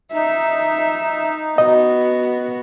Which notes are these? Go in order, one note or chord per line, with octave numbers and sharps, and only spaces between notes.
D#4 E5
B3 F#4 D#5